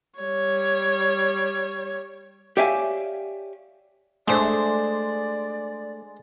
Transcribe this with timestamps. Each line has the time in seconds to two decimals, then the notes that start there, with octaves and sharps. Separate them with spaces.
0.19 G3 C#5
2.57 G4 C#5 D5 E5 F5 G#5
4.28 G#3 A3 D4 C5 D5